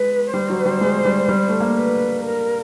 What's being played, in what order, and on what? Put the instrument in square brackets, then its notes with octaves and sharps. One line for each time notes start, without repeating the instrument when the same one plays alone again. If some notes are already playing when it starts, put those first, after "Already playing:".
Already playing: [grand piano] G#3 [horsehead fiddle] B4
[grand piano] G3 [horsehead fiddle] C5
[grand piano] F#3
G3
G#3
G3
G3
A3
A#3
[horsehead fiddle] B4
A#4